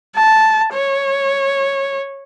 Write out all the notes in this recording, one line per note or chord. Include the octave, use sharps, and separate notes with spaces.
A5
C#5